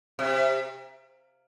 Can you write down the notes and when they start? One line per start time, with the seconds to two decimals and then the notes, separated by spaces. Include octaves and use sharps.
0.19 C3